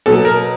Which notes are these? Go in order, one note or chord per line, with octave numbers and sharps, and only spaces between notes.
B2 F#3 A4
A#4